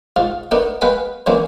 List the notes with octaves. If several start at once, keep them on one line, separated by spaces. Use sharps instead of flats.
G#2 F4 F5
A3 B3 D4 D#4 A#4
G#3 B3 B4 F5 G5 G#5
D3 E3 G#3 A#3 C4 C#4